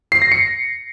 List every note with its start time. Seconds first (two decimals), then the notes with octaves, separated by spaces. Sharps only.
0.12 C7
0.22 A#6
0.32 C#7